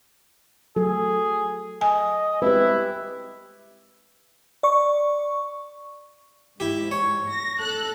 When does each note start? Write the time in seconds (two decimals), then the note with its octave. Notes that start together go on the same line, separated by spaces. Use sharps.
0.76 F#3 G#4 A4
1.81 D#5 G#5
2.42 G#3 C4 E4 G4 B4 E5
4.63 D5 C#6
6.60 G#2 E4 G4
6.91 C#5
7.29 A#6
7.59 A4 F#6